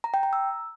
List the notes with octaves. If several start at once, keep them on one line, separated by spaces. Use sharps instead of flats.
A#5
G5
A#5
E6